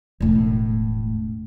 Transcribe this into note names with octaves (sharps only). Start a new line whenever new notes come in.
E1 A2